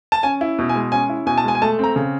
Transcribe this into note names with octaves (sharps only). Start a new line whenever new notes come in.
A5
C#4 G#5
E4
B2
G#5
G#3
C#4 G#5
E4
B2 G#5
A5
G#3 G#5
G#5
A3 A5
C4 A#5
C#3